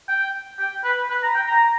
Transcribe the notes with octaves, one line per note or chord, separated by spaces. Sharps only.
G5
G5
B4
B4
A#5
G5
A#5